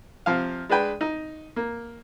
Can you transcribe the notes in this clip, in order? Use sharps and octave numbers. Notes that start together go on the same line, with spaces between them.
C3 F3 F5
G#3 D4 B4 G5
D#4
A#3